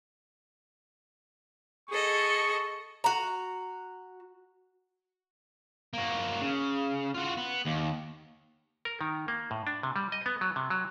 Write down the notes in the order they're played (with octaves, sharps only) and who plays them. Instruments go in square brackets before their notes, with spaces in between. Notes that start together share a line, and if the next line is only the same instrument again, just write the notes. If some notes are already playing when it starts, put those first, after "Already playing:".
[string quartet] G#4 A4 D#5 [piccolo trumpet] C#6
[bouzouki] F#4 A#5
[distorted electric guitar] A#3 F#4
C#3
F4 F#4
B3
D#2
[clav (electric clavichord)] A#4
D#3
A#3
A2
D4
C3
G3
D#5
B3
F#3
C3
F#3